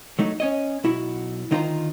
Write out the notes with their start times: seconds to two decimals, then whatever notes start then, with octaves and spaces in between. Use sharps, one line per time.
0.19 F#3 A3 D#4
0.40 C#4 C#5 D#5
0.84 B1 E4 F#4
1.51 D2 D#3 D#4 F4 C5 A#5